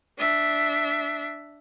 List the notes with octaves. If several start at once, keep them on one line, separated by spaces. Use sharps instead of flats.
D4 E5